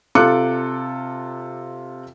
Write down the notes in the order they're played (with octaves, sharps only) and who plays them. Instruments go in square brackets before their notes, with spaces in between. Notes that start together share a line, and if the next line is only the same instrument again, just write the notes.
[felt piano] C3 F4 A4 D6 F#6 C#7